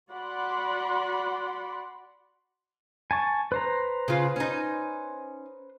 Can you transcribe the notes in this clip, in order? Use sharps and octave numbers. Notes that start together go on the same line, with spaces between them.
F#4 D5 F#5 B5 C6
G#5 A5 C#6
B4 C5 A#5
C#3 F4
C#4 D#4